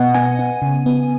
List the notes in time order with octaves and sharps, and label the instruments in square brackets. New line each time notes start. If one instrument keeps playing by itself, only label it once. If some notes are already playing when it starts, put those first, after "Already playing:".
Already playing: [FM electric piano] B2 B3 D#5 F#5
B3 G#5
B3
C#3
B3